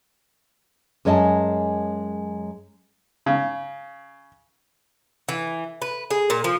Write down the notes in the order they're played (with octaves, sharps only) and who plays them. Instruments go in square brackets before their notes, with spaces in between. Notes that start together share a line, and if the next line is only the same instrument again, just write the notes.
[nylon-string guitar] F#2 G#3 C#5 D#5 G#5 A5
[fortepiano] C#3
[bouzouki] E3
B4
G#4
A#2
F3